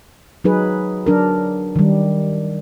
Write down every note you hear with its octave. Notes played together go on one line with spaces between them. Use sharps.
F#3 D#4 G#4 B4
F#3 D4 A#4
D#3 G3